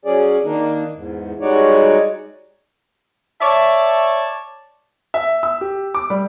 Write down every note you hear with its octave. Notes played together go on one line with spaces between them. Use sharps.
F#3 C#4 G#4 D5
D#3 A#3 D4 D#4
E2 G#2
G3 G#3 D#4 F#4 C#5 D5
C#5 D5 E5 A5
E5
E6
G4
D6
G3